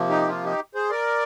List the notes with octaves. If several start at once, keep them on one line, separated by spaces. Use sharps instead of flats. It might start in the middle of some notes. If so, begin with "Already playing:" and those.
Already playing: C3 F3 A#3
D#4 G4
F4
D#4 G4
G#4 C5
A#4 D5